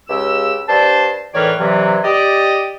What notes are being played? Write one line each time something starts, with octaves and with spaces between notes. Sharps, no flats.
C#2 C#3 G4 E6
G2 D4 C5 A5
A2 D#3 E3 C#5 D5 F6
G2 C3 E3 F#3
G4 D5 D#5